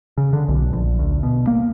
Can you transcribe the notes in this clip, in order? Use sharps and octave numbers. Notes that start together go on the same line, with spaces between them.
C#3
D3
B1
A#1
D2
B2
A#3